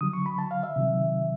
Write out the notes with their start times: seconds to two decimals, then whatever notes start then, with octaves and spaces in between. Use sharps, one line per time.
0.01 D3 F#3 D#6
0.13 C#6
0.26 B5
0.38 A5
0.51 F5
0.63 E5
0.76 C3 D#3 F#3